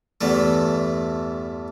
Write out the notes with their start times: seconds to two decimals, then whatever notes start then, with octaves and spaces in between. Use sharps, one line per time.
0.21 E2 G2 E3 A3